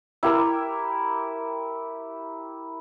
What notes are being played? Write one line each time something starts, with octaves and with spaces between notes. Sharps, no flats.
E4 G4 A#4 A#5